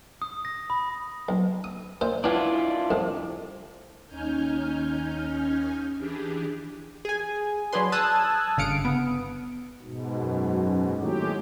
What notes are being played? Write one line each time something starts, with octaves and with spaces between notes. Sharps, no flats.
D#6
A#6
B5
B1
D#6
A#2 E4 C5
B3 C#4 D4 E4 F4
C2 F2 A2
D#2 C#4 D#4 G#5 F6 G6
E3 D4 G4 G#4
G#4 G#5
F#3 D4 G#4 B4 C6
A5 D#6 E6 F#6 G#6
G1 C#3 F5 D#6 C#7 D7
B3
G#2 B2
F#2
D#2 A2 F#3 G#3 G4